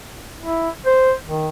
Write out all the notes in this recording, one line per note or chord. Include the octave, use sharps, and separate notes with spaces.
E4
C5
D#3